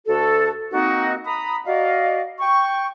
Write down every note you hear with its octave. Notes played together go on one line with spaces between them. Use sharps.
D2 F#4 A4
A#3 C4 D#4 F#4
A#5 B5 D#6
F#4 D5 D#5 F5
G5 C#6